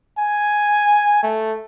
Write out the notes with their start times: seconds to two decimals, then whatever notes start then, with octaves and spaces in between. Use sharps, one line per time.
0.19 G#5
1.23 A3